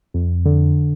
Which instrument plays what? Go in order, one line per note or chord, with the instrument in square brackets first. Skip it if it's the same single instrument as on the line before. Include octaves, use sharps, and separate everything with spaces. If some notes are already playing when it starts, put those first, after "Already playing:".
[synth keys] F2
D3